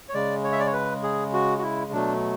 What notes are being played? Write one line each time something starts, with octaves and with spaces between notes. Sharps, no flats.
C#5
C#3 G#3 D5
C#5
E5
D5
C#5
B4
G#4
F#4
F#4
E4
B2 F#3 A3 D4